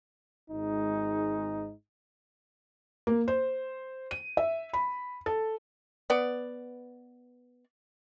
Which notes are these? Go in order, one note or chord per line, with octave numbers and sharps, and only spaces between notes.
G#1 G#2 G#3 D#4
A#3
C5
D#7
E5
B5
A4
B3 D5